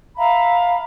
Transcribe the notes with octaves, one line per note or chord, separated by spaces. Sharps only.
E5 F5 A#5 B5